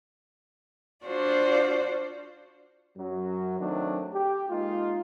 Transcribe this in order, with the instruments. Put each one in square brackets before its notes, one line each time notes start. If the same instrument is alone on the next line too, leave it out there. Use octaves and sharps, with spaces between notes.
[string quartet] D4 F4 F#4 C5 D5
[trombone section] F#2 F#3
D#3 F#3 A3 C4 D4 D#4
G4
G#3 A#3 D#4 F4